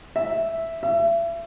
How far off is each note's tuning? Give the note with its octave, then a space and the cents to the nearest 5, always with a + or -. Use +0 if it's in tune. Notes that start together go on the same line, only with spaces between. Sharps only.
E5 +0
E5 +35